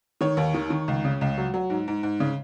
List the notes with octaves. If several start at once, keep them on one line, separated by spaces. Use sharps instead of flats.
D#3 C#5
D#2
D#3
D#3
C#2
C#3
C#2
F#3
F#3
G#2
G#2
G#2
C#3